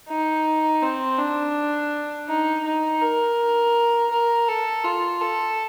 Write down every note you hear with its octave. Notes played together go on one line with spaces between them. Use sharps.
D#4
C4
D4
D#4
D#4
A#4
A#4
A4
F4
A4